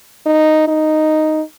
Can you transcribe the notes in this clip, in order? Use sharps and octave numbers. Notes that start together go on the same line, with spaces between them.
D#4
D#4